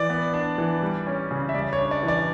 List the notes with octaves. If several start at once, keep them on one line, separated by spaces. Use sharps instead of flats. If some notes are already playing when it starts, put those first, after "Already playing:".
Already playing: E3 D5
B3
D4
E3
G3
C#4
C#3
E5
G3 D5
C#5
D4
D5
E3
D5